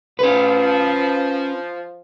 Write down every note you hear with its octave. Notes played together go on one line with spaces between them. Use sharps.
F3 C#4 B4